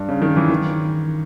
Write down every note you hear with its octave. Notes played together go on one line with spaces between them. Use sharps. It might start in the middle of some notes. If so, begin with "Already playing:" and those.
Already playing: G2
C#3
D#3
E3
D#3